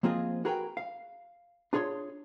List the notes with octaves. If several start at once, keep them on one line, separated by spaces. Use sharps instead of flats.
F3 A#3 C4 F4 G#4 D#5
F#4 G#4 A#4 B4 D#5 G5
F5
D4 F4 G#4 C#5 C6